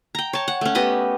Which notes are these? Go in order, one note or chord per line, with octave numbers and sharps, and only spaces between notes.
G5 A#5
C#5 A5
F#5
A3 C#4
B3 G4 D#5 B5